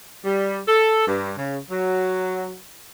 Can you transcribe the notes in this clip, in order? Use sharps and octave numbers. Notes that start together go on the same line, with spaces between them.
G3
A4
G2
C#3
F#3